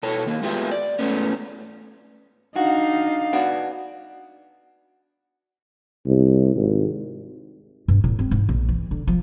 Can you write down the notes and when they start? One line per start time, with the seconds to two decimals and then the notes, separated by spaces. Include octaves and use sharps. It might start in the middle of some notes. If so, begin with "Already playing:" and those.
0.03 B2 A4 C#5
0.26 D#3 A#3
0.42 G#3 A3 B3 F4 G4 E5
0.71 D5
0.99 G#2 A3 B3 C#4
2.56 D4 D#4 F#4 F5
3.33 B3 D4 F#4
6.06 C2
6.56 G#1
7.88 G2
8.04 A2
8.19 C4
8.31 G#2
8.49 A#1
8.69 E3
8.91 D3
9.07 F3